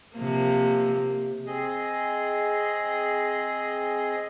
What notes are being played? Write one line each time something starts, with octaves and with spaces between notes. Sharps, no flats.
C3 F3 A#3
C4 G#4 D#5